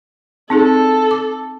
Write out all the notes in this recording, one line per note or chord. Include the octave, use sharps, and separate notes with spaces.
C4 D#4 G#4 A4
D6